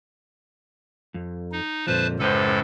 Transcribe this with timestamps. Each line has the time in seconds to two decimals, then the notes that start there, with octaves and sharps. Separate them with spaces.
1.14 F2
1.52 D#4
1.87 F2 A#2 F3 B4 C5 A5
2.19 C#2 F#2 A2 A4 B4 C5